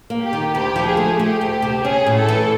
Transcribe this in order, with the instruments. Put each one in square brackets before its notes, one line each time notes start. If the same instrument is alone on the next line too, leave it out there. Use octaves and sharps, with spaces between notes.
[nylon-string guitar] A#3
[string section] G4
[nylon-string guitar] D#3
[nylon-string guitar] D2 [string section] G4
[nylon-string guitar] F3
[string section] G#4
[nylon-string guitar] A3
[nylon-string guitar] A3 [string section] G4
[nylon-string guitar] D2
C3
[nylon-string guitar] C#4 [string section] G#4
[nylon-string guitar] A2
[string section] A4
[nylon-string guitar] E3